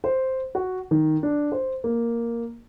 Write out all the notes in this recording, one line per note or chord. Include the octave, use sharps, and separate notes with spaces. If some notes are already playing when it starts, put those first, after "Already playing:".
C5
F#4
D#3
D4
C5
A#3